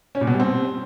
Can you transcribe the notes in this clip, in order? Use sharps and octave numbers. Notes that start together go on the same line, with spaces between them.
C#4
A#2
B2
G3
C4